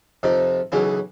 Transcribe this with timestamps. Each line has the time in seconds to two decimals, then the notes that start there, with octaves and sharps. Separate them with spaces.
0.23 F2 C3 D#4
0.72 B1 C#3 E3 E4